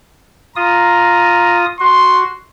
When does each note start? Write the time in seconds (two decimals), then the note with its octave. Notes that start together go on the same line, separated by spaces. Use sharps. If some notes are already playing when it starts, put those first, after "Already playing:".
0.56 F4 A#5 D#6
1.80 F#4 C6